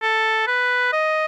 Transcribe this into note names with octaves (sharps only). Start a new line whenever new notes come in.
A4
B4
D#5